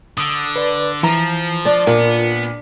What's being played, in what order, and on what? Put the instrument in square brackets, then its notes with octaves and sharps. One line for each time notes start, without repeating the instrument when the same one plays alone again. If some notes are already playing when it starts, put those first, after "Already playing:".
[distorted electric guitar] D3 [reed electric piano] D#6
[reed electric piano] B4 D5
[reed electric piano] E3 [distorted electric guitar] F3 [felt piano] A#5
[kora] D4 D5
[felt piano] A#2 [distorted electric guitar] B3 [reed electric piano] F4 A#4